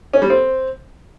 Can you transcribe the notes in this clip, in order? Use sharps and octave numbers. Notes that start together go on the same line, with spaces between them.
C#4
G3
C4